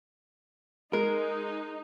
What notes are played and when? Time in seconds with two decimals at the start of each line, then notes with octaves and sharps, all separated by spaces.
0.93 G#3 D#4 A#4